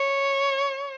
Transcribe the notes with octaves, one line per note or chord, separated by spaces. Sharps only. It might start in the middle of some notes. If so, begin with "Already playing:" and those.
Already playing: C#5